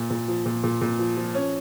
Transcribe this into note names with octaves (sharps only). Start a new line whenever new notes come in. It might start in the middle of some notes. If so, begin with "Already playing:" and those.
Already playing: A#2
A#2
F3
A#2
A#2
A#2
F3
F3
C#4